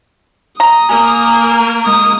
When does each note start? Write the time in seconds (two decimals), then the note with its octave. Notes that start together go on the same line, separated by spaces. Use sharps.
0.60 A#5 D#6
0.89 A#3 A#4 G#5
1.87 G#3 D#6